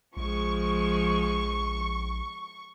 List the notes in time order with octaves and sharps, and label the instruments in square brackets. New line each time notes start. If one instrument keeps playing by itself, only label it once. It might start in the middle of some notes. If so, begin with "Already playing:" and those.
[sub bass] A#1 [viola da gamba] F3 G#3 [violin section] C#6